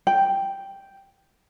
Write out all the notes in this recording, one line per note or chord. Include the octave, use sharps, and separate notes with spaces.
G5